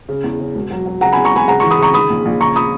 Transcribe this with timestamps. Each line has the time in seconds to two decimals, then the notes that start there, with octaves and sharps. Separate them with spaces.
0.09 C#3
0.24 E2
0.40 C#3
0.55 E1
0.71 F#3
0.86 F#3
1.01 C#3 F#5 A#5
1.12 E2 G#5 B5
1.24 A#5 C#6
1.32 E1 G#5 B5
1.48 C#3 F#5 A#5
1.59 E3 A#5 C#6
1.71 B5 D#6
1.78 C#3 A#5 C#6
1.94 D#3 B5 D#6
2.10 A#1
2.25 A#1
2.41 C#3 A#5 C#6
2.56 B5 D#6